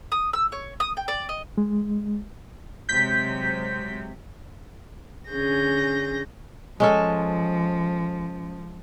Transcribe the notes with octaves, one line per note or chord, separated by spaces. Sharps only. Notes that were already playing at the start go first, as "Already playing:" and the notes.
D#6
E6
C#5
D#6
G5
D5
D#5
G#3
C3 F#3 G#3 G6 B6
D3 C#4 G#4 G6 A#6
F3 G#3 C#4 A4